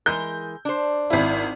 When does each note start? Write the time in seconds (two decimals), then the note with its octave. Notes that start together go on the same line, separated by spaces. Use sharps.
0.06 E3 G#3 A#4 G6
0.65 D4 C5
1.10 G#1 E4